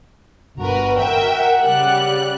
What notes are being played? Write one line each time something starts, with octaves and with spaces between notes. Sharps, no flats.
G1 F#4 A#4 B4
A#4 E5 G5
F#5
C#3 G3 F#6